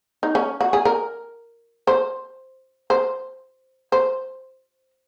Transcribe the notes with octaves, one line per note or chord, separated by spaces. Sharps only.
D#4
C#4
F#4
G#4
A#4
C5
C5
C5